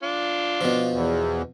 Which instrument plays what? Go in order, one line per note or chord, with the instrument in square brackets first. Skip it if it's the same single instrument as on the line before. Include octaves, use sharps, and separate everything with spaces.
[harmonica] D4 F4
[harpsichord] B2 F3
[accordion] E2